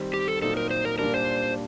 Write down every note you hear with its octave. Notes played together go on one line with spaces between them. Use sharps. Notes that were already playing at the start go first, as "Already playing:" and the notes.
Already playing: D#3 G3 C4
G4
A4
A#2 F#3 C4 D#4 A4
A#4
C5
A#4
A#2 G3 D4 A#4
C5